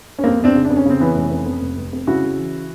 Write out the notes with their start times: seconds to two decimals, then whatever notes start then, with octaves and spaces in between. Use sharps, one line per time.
0.19 C#4
0.24 F2 A#3 C4
0.40 F2 C4 D4
0.55 C#3
0.65 D4
0.70 F2
0.77 C#4
0.85 C#3 C4
1.00 E3 B3 C#4
1.15 F1
1.31 F2
1.46 F2
1.61 F1
1.77 F1
1.93 F2
2.07 C#3 E4 F#4
2.23 C#3
2.38 E3